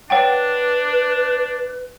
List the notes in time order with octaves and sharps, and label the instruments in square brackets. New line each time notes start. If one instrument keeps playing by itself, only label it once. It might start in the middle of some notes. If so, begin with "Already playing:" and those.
[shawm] D4 [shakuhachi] B4 [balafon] C#5 F#5 G5